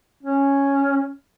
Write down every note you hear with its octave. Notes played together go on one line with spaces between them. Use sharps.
C#4